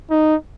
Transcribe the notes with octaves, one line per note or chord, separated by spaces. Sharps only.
D#4